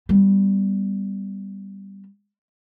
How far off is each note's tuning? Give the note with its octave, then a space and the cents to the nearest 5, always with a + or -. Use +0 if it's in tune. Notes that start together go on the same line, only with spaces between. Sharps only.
G3 +0 B3 +0